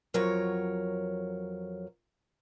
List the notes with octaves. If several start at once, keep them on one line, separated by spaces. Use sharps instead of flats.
F2 F#3 A#4 C#5